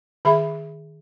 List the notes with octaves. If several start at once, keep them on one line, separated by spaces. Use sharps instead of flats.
D#3 G#4 E5 B5